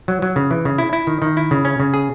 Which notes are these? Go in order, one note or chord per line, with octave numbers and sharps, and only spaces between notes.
F#3
F#3
C#3
E3
C#3
E4
E4
D#3
D#3
E4
C#3
C#4
C#3
G#4